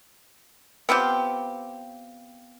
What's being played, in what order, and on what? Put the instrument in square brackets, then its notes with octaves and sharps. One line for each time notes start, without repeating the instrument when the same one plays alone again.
[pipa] B3 C4 F4 G4